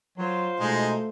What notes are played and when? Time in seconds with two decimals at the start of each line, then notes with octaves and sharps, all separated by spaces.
0.18 F#3 F4 C5
0.60 B2 G#3 A3 D#4